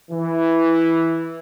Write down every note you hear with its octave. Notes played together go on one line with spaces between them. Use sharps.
E3